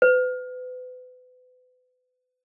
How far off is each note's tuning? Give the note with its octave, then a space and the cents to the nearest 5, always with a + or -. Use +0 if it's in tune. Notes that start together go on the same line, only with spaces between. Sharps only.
B4 +35